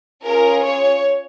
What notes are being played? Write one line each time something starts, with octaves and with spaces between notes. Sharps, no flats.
C#4 F4 G#4 A#4
C#5